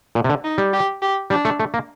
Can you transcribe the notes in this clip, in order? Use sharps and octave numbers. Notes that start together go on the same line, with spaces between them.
A#2
C3
D3
D#4
G3
G4
G4
G3 D4
A3
A3
A#3